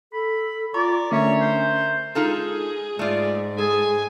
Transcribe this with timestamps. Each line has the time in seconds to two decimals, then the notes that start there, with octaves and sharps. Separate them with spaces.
0.13 A4 B5
0.74 F4 D5 A#5 C#6
1.11 D3 A3 C#4 D4 A#4 C#5 E5 A#5
1.41 C5
2.15 G#3 D#4 F4 G#4 A4
2.99 G#2 A3 F4 D5
3.58 G#4 A4 G#5